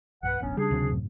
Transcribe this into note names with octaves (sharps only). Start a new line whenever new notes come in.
B1 G2 B4 F#5
E1 A1 F#3 B3 C#4 D4
C#3 G3 D4 G#4
D2 C3 F#3
F#2 A2 C#3